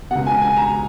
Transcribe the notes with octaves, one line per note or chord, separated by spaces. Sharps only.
C#2 B2 F#5
G#5
G#5
A#5